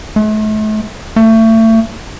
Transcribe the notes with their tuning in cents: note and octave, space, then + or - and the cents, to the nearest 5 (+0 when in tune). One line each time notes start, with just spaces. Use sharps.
A3 -40
A3 +30